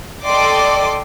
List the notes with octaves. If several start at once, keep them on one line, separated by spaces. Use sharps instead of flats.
A4 D5 D#5 G5 C6 D6